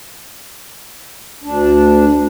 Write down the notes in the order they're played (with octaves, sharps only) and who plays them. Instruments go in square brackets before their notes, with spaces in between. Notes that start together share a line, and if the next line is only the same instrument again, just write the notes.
[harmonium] D2 D4